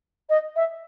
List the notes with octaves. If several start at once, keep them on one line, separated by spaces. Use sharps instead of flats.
D#5
E5